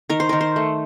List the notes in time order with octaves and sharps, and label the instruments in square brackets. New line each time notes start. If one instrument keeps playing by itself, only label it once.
[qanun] D#3 A#4
C5
D#3 A#4
C5
A3